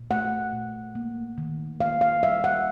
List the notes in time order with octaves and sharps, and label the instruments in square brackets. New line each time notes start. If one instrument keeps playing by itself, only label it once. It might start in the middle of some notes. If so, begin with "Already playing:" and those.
Already playing: [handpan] A#2
A3 F#5
A#2
A#3
D#3
A#3 F5
F5
G3 E5
F#5